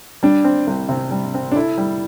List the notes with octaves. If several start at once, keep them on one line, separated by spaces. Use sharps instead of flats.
G3 D4
C4
C2
C3
G3
C4
D4
E4 A4
G3